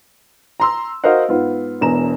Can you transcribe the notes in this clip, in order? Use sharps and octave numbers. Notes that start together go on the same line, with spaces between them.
A#5 C6 E6
F#4 A#4 C5 D#5 F5 F#5
G#2 B3 F4
E1 E2 D4 A#5 E7